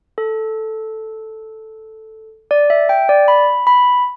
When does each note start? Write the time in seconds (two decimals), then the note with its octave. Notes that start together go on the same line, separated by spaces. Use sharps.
0.18 A4
2.51 D5
2.70 E5
2.89 G5
3.09 D5
3.28 B5
3.67 B5